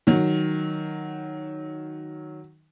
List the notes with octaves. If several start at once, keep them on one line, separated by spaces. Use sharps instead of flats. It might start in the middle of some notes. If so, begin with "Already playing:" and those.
D#3 F#3